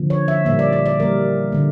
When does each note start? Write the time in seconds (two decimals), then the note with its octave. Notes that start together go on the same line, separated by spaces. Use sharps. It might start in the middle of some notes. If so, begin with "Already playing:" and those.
Already playing: D3 F3 A#3
0.10 C#5
0.28 E5
0.45 A#2 G3 A#3 E5
0.59 D5
0.73 D5
0.86 D5
0.99 E3 G3 A#3 A#4
1.52 D3 A3